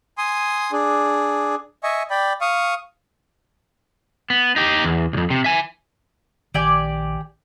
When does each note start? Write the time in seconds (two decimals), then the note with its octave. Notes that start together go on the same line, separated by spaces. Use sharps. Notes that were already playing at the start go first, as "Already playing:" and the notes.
0.18 G#5 C6 D#6
0.72 D4 G#4
1.83 D#5 E5 G#5 C#6
2.10 D5 G5 B5
2.41 F5 C#6 D#6
4.30 B3
4.56 D#4 G4
4.84 E2
5.13 B1 F2
5.30 C3
5.44 E5 G#5
6.54 A#1 D#3 G4 D5 G#5